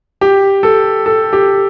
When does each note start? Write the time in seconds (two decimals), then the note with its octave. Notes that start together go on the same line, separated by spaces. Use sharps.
0.21 G4
0.63 A4
1.06 A4
1.33 G4